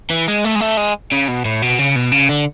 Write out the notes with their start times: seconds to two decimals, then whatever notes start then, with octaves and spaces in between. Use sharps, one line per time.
0.10 E3
0.28 G#3
0.45 A3
0.56 G#3
0.61 A3
0.77 G#3
1.12 C#3
1.28 B2
1.45 A2
1.62 B2
1.79 C#3
1.96 B2
2.12 C#3
2.29 D3